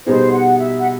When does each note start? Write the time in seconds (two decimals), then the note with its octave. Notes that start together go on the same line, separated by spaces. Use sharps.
0.06 B2 G3 B3 D#4 G#4 C5
0.32 F#5
0.59 E5
0.78 F#5